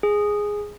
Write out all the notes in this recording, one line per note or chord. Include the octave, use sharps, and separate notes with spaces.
G#4